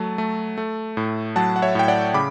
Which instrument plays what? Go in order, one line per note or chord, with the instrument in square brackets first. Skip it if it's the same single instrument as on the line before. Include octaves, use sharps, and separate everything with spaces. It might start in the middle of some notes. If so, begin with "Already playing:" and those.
Already playing: [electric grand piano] F#3 A3 A5
A3
A3
A2
F#3 F#5 A5
F#5
C#5 E5
A2 G5
D5 F#5
C#3 B5 D6